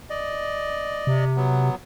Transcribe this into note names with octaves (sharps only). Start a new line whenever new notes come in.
D5 D#5
C3
F#3 B3